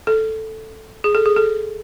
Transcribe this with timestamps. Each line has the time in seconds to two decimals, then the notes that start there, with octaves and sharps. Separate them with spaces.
0.07 A4
1.04 G#4
1.15 A4
1.26 G#4
1.37 A4